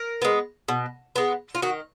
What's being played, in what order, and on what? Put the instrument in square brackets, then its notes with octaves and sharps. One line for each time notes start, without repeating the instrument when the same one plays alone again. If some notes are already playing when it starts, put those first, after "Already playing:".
Already playing: [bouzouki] A#4
G#3 B3
B2
G#3 B3
F4
D#3 F#4